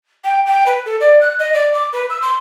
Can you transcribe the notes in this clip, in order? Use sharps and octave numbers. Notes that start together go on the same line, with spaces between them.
G5
G5
B4
A4
D5
F#6
D#5
D5
D6
B4
E6
C6